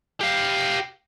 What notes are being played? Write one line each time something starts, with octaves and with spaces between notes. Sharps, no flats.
G4 F5